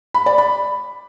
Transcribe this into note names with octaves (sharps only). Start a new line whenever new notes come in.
B5
D5
B5